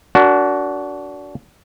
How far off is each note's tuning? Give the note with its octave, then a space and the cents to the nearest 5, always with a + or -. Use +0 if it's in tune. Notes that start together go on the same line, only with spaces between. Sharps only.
D4 -25 F#4 +10 A#4 -5